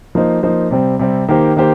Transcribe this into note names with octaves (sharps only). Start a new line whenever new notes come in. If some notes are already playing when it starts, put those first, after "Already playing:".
F3 A#3 D#4 C5
F3 A#3 D#4 C5
C3 G3 C4
C3 G3 C4
D#3 A#3 G4 C5
D#3 A#3 G4 C5